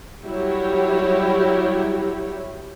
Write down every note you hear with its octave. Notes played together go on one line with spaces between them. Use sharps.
F#3 G3 E4 G4 C#5